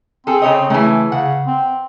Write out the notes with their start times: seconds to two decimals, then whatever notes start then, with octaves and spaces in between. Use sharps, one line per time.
0.27 C4 G#4 A4
0.42 C#3 C#5 D#5
0.70 C#3 E3 A3
1.12 C#3 F#5
1.47 C4